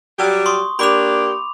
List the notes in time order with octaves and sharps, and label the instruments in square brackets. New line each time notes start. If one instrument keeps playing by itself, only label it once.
[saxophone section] F#3 G3 G4
[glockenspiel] C6 C#6 D#6
[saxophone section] A#3 D4 G4 [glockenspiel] B5 D6 F7